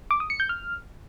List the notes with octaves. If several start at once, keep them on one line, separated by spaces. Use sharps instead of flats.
D6
D#6
C#7
G6
F6